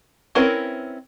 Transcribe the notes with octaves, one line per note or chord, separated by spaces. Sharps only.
C4 C#4 E4 A#4 B4